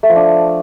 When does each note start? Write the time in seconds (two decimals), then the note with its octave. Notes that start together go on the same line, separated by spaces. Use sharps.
0.03 A3
0.09 F3
0.16 D4